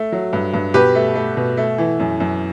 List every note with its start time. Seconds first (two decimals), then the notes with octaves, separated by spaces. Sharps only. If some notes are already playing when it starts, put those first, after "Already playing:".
Already playing: A3
0.12 F#3
0.33 G2
0.54 G2
0.74 B2 G4 B4
0.95 A3
1.15 A3
1.37 B2
1.57 A3
1.78 E3
2.00 F#2
2.20 F#2